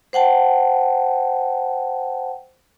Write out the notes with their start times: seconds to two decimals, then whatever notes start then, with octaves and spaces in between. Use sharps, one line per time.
0.13 C5 F#5 G5 A5